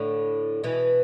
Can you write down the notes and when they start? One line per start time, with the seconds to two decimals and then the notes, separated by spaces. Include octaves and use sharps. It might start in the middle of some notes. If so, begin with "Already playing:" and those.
Already playing: A2 D3
0.64 B2 E3